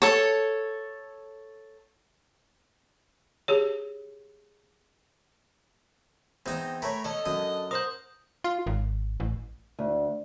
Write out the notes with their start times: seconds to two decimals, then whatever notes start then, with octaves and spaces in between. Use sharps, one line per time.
0.02 A4 C#5
3.48 G4 G#4 C#5
6.46 E2 C4 D#4 D#5
6.82 A3 A#4 C#5 B5
7.04 D3 A4 C#5 D#5
7.26 F#2 D#6
7.71 A#4 C5 F#5 D#6 G6
8.44 F4
8.67 G#1
9.20 A1
9.79 D2